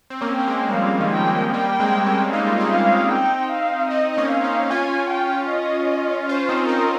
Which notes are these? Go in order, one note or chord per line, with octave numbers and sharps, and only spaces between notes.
C4
A#3 C#4
A#3 G5
G#3 C4
G3
F3 F5
D#3 G3
G5
F3 G#3
G3 A#3 G5
G#3 C4
A#3 C#4
D#4 F5
F4
C4 D#4
F5
G5
F5
C4 D#4 D#5
D#4
A#3 C#4
F5
C4 D#4
C#4 F4 G#5
G5
D#5
C#4 F4 C5
C4 D#4
C4 D#4 A#4